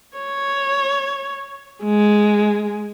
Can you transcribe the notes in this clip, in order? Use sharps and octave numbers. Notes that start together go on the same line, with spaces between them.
C#5
G#3